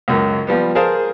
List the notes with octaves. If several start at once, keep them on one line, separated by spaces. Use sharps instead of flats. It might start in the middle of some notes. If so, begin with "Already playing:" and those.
C#2 F#2
F3 G3 B3
G#4 A#4 C5 F5 A5